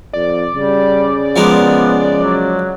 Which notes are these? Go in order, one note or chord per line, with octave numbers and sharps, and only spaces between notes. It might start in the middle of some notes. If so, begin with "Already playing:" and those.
F2 D5
C#3 G3
F3 G#3 B3 A#4
F#3